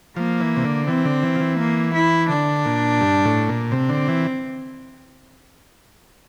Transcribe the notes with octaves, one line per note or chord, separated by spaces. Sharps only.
F3 A#3
E3
C3
D3
E3 C4
D3
E3
F3
E3
A#3
E4
D3 D4
A#2
G2
A2
A#2
C3 C4
D3
E3